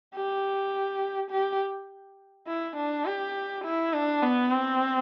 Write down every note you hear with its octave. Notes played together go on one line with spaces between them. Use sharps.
G4
G4
E4
D4
G4
E4
D4
B3
C4